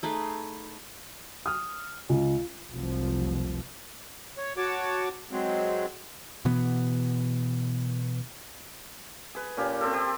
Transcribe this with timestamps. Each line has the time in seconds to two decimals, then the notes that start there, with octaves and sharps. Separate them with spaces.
0.03 A3 D#4 G#4 B4
1.46 D#6 F6
2.09 C#2
2.72 F1 C2 F3 F#3
4.37 C#5
4.57 F#4 C#5 A5 D6
5.32 F#3 G#3 C4
6.45 B2 E3 B3
9.35 G#4 B4
9.57 A#2 C#4 G4
9.81 C4 G4 A4
9.93 G4 C5